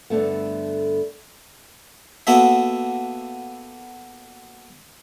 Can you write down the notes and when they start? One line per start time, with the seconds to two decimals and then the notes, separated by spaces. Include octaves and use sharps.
0.10 G2 D3 A3 B3
2.27 A#3 B3 F#4 A4 E5